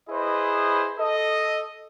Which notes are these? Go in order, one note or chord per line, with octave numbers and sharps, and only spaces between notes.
E4 G#4 B4 C5 D#5
A4 D#5